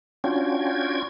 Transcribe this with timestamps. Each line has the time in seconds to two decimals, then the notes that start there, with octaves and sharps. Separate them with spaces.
0.24 C#4 D4 F4 F#4 G5 G#6